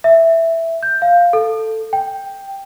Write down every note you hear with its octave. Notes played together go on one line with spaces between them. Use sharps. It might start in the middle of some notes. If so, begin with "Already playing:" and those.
E5
G6
F5
A4
G5